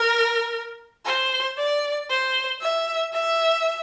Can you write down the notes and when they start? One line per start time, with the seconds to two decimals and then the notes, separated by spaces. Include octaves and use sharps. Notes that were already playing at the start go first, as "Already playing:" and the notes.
Already playing: A#4
1.06 C5
1.58 D5
2.10 C5
2.61 E5
3.13 E5